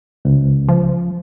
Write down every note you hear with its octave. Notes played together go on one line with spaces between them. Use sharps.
C#2
F3